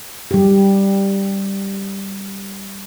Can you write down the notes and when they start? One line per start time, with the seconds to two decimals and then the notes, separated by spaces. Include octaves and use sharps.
0.31 G3 G4